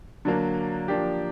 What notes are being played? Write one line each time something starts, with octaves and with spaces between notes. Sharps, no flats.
D3 F#3 A#3
F3 A#3 D4 G4